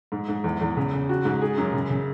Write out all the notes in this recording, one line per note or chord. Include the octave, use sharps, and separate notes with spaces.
G#2
G#2
E2
E2
C#3
C#3
F#4
G#2
G#4
F#2
C#3
C#3